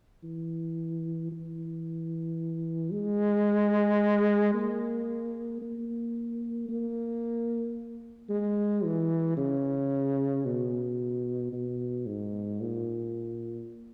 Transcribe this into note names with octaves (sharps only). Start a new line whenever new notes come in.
E3
E3
G#3
A#3
A#3
A#3
G#3
E3
C#3
B2
B2
G#2
A#2